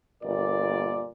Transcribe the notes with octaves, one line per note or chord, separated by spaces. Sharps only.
G1 A#2 A#3 D5